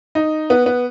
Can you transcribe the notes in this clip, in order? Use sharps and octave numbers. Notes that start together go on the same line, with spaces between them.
D#4
B3
B3